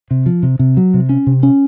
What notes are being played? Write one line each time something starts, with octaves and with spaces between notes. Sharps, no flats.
C3
F3
C3
C3
F#3
C3
C#4
C3
C#4